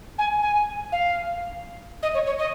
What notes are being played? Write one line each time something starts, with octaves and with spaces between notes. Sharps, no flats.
G#5
G#5
F5
D#5
C#5
C#5
D#5